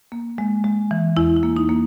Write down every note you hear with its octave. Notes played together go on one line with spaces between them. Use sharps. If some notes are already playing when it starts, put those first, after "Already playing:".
A#3
G#3
G#3
E3
E2 E4
E4
A#3
D#4
A#3